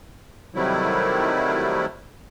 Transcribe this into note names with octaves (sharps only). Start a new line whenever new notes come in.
C3 D#3 F#3 G3 A3 E4